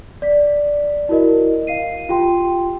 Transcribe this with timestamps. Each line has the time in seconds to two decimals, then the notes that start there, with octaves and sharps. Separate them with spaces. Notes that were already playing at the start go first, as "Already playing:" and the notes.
0.22 D5 B6
1.09 E4 F#4 A#4 D#5
1.67 F5 C7 D#7
2.09 F4 G4 G5 C6